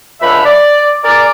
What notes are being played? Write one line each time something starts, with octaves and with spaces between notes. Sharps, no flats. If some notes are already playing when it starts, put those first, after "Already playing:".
C#2 D3 A3 E5 B5
D5
G#4 A#4 D5